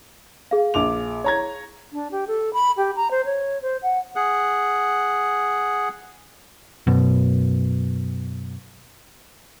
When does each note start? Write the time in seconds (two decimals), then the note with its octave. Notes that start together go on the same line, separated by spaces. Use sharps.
0.51 G#4 F5
0.74 A#1 D6 F7
1.24 C#5 A#5 G#6
1.93 D4
2.11 G4
2.27 A4
2.53 B5
2.77 G4
2.96 A#5
3.11 C5
3.25 C#5
3.62 C5
3.82 F#5
4.16 G#4 F#5
6.87 F#2 B2